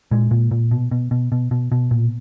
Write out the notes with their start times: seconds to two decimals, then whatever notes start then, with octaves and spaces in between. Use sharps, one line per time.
0.11 A#2 G#3
0.31 A#2
0.51 A#2
0.71 B2
0.91 B2
1.11 B2
1.32 B2
1.51 B2
1.72 B2
1.91 A#2